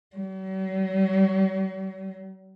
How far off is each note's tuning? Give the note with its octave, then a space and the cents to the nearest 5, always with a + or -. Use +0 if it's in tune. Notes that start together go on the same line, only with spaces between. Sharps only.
F#3 +45